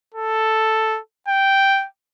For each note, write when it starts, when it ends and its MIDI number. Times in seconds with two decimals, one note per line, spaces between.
0.14 0.99 69
1.28 1.86 79